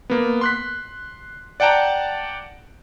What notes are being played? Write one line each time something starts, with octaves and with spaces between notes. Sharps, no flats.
A#3 B3
C6 F#6 B6
D5 F#5 G5 A5 A#5